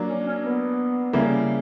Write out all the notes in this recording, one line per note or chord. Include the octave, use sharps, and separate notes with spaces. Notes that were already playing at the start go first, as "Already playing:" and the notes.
Already playing: F#3 A#3 D4
C#4
C#4
B3
C#3 G3 A#3 E4